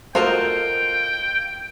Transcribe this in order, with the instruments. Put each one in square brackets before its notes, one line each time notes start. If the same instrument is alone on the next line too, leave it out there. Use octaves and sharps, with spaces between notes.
[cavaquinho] F4 A#4 D#5 [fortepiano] F#4 A4 C5 [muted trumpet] G5